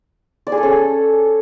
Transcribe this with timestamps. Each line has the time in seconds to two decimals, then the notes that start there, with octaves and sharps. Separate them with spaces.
0.47 D5
0.52 G#4
0.57 A4
0.63 C#4